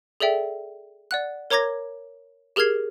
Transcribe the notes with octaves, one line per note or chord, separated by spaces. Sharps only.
G#4 A4 D5 E5 G5
D5 F#5 F#6
A#4 C#5 A#5 D6 G#6 A#6
G4 G#4 A#4 F6 G#6 C7